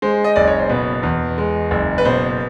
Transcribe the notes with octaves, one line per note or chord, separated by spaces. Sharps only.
G#3 C5
D#5
F#1 D5
C#5
C5
B2 B4
E2
G#3
F#1
B4
B2 C5